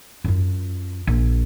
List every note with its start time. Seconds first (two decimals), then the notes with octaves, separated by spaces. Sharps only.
0.24 F#2 F4
1.07 A#1